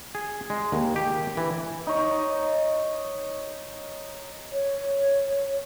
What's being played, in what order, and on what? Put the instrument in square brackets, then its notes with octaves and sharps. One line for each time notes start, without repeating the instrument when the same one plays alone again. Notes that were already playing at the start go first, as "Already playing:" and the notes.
[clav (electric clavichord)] G#4
G#3
D#2
G4
E3
[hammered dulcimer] D#4 C#5
[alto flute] C#5